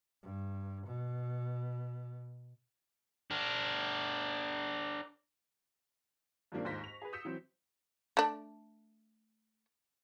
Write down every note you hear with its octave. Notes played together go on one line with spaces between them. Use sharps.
G2
B2
D4 A#4
G2 D#3 F3 G3 A#3 D4
D#2 G#2 F4 C5 A#6 B6
C#6 F7
G#4 B4
D#6 E6 G6 B6 C#7 E7
E3 F#3 C4
A3 D4